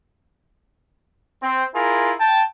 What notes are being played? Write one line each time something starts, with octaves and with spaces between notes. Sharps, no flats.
C4
E4 F4 G#4 A#4
G5 A5